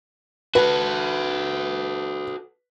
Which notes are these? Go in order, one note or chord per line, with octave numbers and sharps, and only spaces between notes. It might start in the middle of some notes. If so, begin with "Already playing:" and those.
F#4 A4 B4